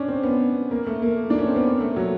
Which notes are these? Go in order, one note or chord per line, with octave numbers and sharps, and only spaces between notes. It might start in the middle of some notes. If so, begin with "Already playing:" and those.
Already playing: C#4 D4
C4
B3
A#3
A3
A#3
D4
C#4
C4
B3
A#3
A3
F#3